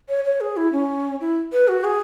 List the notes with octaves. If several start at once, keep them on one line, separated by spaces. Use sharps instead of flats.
C#5
C#5
G#4
E4
C#4
E4
B4
F#4
G#4